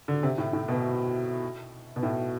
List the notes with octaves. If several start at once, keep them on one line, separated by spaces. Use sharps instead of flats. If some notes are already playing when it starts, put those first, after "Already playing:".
D3
C3
A2
A2
B2
B2
A2